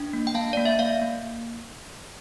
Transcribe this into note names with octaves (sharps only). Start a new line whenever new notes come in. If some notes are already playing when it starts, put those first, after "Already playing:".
Already playing: D4
A#3
G5
A#3 F5 A5
A#3 D5
E5
A#3 D5 F5
A#3